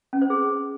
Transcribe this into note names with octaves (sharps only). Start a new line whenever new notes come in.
C#4
C5
G#4